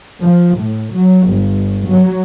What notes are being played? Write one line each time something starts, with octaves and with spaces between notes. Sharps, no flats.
F3
A2
F#3
G1
F#3